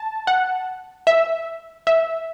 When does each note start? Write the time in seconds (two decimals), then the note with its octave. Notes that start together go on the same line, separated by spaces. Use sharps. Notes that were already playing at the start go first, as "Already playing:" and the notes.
Already playing: A5
0.27 F#5
1.07 E5
1.87 E5